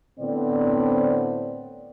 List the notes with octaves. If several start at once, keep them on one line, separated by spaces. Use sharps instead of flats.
A2 D3 B3 C4 D5